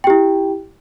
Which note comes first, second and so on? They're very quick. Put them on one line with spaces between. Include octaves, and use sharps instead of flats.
G5 G4 E4